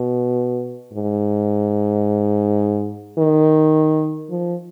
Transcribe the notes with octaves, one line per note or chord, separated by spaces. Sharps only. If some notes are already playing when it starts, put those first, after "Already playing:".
Already playing: B2
G#2
D#3
F3